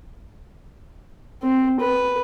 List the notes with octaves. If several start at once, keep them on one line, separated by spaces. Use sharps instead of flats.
C4
B4